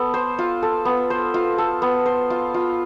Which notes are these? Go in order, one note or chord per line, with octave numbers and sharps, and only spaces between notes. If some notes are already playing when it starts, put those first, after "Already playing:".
Already playing: B3 A4
C5
F4
A4
B3
C5
F4
A4
B3
C5
F4
F4